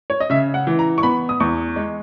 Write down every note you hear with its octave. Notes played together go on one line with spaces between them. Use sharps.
C#5
D#5
C#3 E5
F#5
E3
A#5
C#6
B3 B5
D#6
E2 C#6
G#3